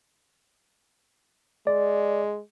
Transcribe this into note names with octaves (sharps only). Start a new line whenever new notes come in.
G#3 D5